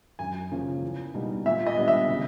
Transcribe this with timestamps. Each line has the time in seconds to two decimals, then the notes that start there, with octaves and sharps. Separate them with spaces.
0.19 F#2 G#5
0.51 C#3 F3 A#3 C#4
0.82 E2
1.14 B2 G3 A#3 D#4
1.46 A#2 E5
1.67 D#5
1.77 G3 B3 D4
1.88 E5
2.08 C#3